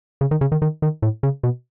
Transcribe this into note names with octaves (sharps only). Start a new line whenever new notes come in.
C#3
D#3
C#3
D#3
D#3
D#3
A2
C#3
B2